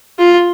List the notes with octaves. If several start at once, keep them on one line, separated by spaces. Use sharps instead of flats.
F4